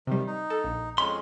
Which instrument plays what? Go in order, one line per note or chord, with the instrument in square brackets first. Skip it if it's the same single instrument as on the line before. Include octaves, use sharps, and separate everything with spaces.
[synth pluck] C3 G3 [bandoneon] D#3
[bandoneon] D#4
[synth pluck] A4
A#1
[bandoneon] F2 G#3 C#4 [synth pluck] B5 [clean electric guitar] C6